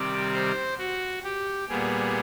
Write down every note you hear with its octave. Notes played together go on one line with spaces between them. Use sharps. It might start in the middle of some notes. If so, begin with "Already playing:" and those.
Already playing: C3 D#3 G3 C4 D5
C5
F#4
G4
A#2 G3 B3 G#4